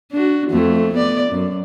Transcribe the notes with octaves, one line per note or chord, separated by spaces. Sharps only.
D4 F#4
F2 A3
B3 D5
F#2